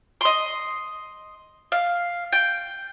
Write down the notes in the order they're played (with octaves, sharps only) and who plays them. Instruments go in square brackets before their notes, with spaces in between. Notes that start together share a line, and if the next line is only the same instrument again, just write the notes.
[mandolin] D#5 C6
F5
G5